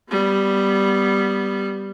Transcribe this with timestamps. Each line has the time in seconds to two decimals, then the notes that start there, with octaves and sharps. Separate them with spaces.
0.10 G3 B3